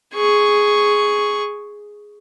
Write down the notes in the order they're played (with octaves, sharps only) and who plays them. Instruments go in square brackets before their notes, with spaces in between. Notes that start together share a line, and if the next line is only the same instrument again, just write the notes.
[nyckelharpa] G#4 C#6